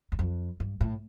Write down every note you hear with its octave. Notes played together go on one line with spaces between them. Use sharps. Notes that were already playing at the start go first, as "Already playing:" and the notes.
E2
F2
G2
A2